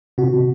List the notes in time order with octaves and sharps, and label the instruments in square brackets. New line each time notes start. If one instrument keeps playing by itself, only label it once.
[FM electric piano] C3 F#4
C3